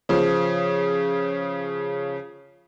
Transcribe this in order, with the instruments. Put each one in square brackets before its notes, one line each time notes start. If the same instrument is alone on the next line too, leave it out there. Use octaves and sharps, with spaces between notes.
[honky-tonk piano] C#3 F3